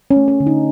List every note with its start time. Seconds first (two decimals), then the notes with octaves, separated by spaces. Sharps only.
0.11 C#4
0.16 A3
0.28 C#4
0.40 D3
0.47 D#4